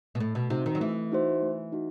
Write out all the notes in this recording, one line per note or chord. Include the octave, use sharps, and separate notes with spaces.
B2
A2 A3
B2
C3 D#4 F#4 C5
D#3
F#3
E3 A3
D#4 F#4 C5
A3
D#4 F#4